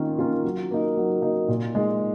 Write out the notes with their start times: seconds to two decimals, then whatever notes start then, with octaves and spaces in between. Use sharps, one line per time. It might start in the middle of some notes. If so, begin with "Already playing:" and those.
Already playing: D#3 A#3 C#4 F4
0.19 A#3 C#4 F4
0.44 F#3
0.71 A#3 D#4
0.97 F#3
1.22 A#3 D#4
1.48 A#2
1.75 G#3 D#4 G#4